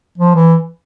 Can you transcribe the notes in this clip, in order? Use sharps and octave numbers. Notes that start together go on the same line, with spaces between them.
F3
E3